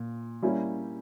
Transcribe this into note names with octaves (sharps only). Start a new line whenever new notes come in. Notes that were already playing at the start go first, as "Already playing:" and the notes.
Already playing: A#2
G3 A#3 C#4 E4 G4